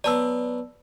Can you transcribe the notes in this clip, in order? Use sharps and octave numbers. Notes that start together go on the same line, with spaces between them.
F#3 B3 D5 A5 E6